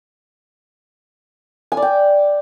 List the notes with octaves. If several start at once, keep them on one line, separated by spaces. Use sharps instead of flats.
G#5
D5
G5